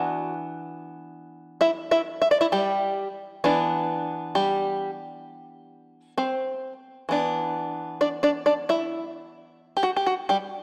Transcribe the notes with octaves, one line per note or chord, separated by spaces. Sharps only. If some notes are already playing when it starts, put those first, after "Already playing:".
Already playing: E3 B3 D4 F#4 F#5
E4 E5
E4 E5
E5
D5
E4 E5
G3 G4
E3 B3 D4
G3 G4
C4 C5
E3 B3 D4
D4 D5
D4 D5
D4 D5
E4 E5
G4
F#4
G4
F#4
G3 G4